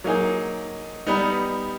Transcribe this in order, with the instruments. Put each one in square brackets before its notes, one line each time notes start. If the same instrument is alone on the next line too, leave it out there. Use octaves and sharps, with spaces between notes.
[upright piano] F#3 A#3 D#4 G#4
G3 B3 D#4